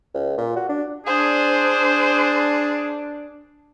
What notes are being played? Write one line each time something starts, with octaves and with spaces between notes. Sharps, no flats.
C#2
A#2
F#4
D4
D4 G#4 C5